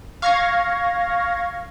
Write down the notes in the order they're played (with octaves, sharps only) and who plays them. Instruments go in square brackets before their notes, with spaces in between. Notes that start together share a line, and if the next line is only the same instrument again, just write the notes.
[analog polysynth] F5 C#6 F6 G#6 A#6